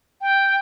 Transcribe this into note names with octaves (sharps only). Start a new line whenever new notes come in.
G5